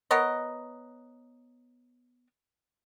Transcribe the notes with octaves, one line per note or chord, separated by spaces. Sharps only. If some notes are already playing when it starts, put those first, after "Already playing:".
B3 A#4 C#5 D#5